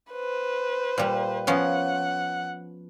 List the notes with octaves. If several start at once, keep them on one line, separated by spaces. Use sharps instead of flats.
B4 C5
A#2 G3
F3 B3 C#4 F#5